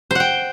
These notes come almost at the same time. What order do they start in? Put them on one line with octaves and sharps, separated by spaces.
C5 F#5 G5